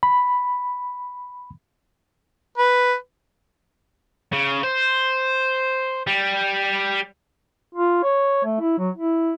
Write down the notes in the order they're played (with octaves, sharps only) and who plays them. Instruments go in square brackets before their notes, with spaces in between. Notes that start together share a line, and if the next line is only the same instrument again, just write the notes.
[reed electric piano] B5
[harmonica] B4
[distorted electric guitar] C#3
C5
G3
[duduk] F4
C#5
A3
E4
F#3
E4